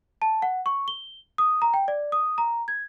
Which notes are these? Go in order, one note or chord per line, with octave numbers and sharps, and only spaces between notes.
A5
F#5
C#6
G7
D#6
A#5
G5
D5
D#6
A#5
G#6